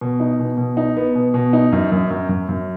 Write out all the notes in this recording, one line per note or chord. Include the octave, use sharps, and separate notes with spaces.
B2
D#4
B2
B2
D#4
B3
B2
B2
D#4
F#2
F#2
F#2
F#2
F#2